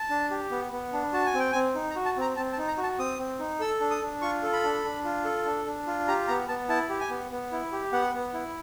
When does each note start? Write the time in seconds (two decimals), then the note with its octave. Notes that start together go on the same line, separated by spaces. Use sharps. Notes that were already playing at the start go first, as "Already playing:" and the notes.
Already playing: A5
0.10 D4
0.31 G4
0.51 B3
0.72 B3
0.93 D4
1.13 F#4 A5
1.26 G#5
1.34 C4 G5
1.52 C4 G#5
1.75 D#4
1.90 A#5
1.96 F#4
2.05 A5
2.17 C4 A#5
2.36 C4 A5
2.53 A5
2.58 D#4
2.68 A#5
2.77 F#4
2.83 A5
2.99 C4 D#6
3.19 C4
3.40 D#4
3.60 A4 E6
3.80 D4
3.91 D#6
4.02 D4
4.22 F4 C#6
4.43 A4
4.53 B5
4.64 D4
4.84 D4
5.05 F4
5.25 A4
5.45 D4
5.66 D4
5.87 F4
6.08 G4 A#5
6.28 B3 A#5
6.48 B3 A5
6.69 E4 A5
6.89 G4
7.01 G#5
7.10 B3
7.31 B3
7.52 E4
7.72 G4
7.93 B3 F#5
8.14 B3
8.34 E4